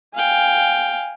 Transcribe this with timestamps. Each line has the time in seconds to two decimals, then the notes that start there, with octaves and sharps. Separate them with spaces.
0.15 F5 G5 G#5